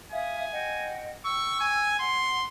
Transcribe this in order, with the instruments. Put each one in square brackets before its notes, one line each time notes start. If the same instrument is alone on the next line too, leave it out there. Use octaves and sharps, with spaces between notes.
[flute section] E5 F5 D#6 [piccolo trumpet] G#5
[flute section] D#5 F#5 G5
[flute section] G5 E6 [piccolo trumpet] C#6
[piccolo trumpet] G#5
[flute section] F#5 [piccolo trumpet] C6